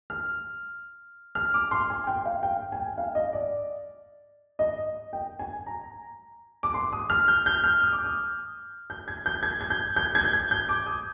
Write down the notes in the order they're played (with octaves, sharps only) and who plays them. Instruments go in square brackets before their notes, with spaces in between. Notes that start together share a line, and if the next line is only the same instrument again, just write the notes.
[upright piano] F6
F6
D6
C6
G#5
G5
F5
G5
G#5
G5
F5
D#5
D5
D#5
G5
G#5
A#5
D6
C6
D#6
F6
G6
G6
F6
D#6
D6
D#6
G6
G#6
G6
G#6
G#6
G6
G6
G#6
G6
G#6
G6
D6
D#6